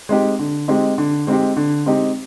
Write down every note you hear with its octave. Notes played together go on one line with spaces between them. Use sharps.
G#3 C4 D#4 G4
D3
G#3 C4 D#4 G4
D3
G#3 C4 D#4 G4
D3
G#3 C4 D#4 G4